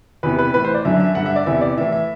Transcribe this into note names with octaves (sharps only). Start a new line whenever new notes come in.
E2 C3 E3 B4
B4
A2 E3 B4
C5
D5
F#2 D3 E5
E5
G2 D3 F#5
E5
D5
E2 C3 E3 E5
D5
A2 E3 E5
E5